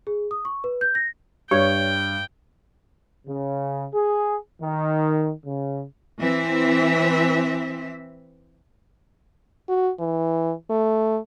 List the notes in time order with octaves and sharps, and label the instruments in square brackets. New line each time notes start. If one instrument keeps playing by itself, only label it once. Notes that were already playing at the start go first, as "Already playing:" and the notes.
[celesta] G#4
D#6
C#6
B4
G6
A#6
[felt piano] G2 [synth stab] C#5 [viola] G5
[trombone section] C#3
G#4
D#3
C#3
[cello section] E3 C4 E5
[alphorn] F#4
E3
A3